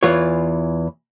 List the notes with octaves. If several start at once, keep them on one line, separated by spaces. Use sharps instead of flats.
E2 E3 F4 C#5